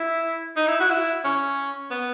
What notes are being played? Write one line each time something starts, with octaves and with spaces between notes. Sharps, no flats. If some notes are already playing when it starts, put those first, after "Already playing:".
Already playing: E4
D#4
E4
F#4
E4
C#4
B3